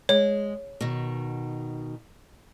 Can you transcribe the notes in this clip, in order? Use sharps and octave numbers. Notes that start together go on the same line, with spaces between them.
G#3 C#5
B2 D#3